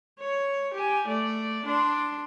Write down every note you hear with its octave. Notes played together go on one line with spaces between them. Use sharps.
C#5
G4 G#5
A3 D5
D4 C6